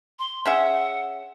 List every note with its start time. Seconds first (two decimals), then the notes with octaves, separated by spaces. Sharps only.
0.19 C6
0.45 C#4 G#4 E5 F#5